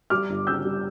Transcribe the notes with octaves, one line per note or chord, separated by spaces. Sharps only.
G3 D6 F6
G1
C#3 E6 G6
G3